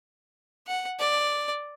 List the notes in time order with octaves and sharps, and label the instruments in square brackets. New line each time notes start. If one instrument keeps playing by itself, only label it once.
[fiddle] F#5
D5